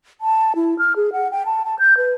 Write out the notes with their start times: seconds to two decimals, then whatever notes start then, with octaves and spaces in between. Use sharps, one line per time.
0.21 A5
0.56 E4
0.79 F6
0.96 G#4
1.13 F#5
1.31 G5
1.46 A5
1.65 A5
1.79 G6
1.97 B4